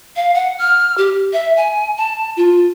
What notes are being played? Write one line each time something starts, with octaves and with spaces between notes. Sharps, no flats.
F5
F#5
F6
G4
E5
G#5
A5
F4